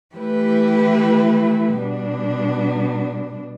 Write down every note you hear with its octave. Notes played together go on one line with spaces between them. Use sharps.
E3 A3 E4 G4 B4
B2 G3 D4